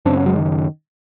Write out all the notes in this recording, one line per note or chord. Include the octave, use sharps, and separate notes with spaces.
F#2 C#3 C4 D4
B3 C#4
F#3 G#3
D#3